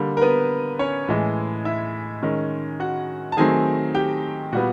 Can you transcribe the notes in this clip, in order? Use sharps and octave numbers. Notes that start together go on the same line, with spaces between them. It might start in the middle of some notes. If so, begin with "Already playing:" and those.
Already playing: D3 G3 A#3
A#4
B3 B4
C#4 C#5
A2 E3 G#3
E4 E5
D#3 G#3 C#4
F#4 F#5
A5
D#3 F#3 A3 C4 G#4 G#5
G4 G5
A#2 G3 B3 F#4 F#5